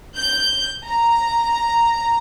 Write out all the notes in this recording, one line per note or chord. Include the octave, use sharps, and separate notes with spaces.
G6
A#5